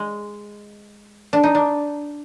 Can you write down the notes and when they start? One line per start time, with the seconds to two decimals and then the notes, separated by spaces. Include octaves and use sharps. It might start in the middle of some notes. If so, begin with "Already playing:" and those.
Already playing: G#3
1.33 D4
1.43 D#4
1.55 D4